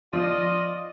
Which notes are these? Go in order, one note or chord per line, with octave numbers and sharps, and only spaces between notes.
F3 F4 D5 D#5